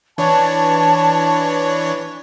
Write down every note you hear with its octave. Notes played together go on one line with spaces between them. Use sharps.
E3 D4 C#5 A5